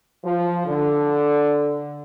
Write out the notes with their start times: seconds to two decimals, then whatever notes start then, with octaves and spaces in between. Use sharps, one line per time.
0.24 F3
0.66 D3